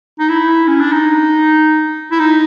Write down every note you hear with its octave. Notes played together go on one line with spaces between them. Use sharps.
D#4
E4
C#4
D4
D#4
E4
D#4